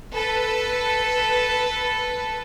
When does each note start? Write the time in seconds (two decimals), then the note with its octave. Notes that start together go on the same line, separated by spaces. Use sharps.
0.14 A4 B4